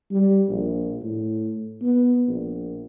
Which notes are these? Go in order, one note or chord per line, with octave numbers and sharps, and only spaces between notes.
G3
A#1
A2
B3
A#1